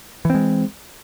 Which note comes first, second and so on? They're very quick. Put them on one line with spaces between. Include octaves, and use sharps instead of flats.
E3 C4 G#3